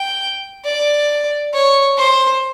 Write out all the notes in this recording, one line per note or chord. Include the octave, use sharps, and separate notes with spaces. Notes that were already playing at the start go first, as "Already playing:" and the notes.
Already playing: G5
D5
C#5
C5